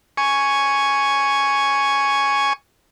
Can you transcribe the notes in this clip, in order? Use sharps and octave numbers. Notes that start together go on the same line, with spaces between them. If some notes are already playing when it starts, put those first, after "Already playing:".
G#5 C#6